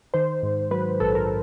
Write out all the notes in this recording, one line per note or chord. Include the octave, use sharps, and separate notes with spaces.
D#3 C5
G#2
F#3 B4
A#1 A4
A#4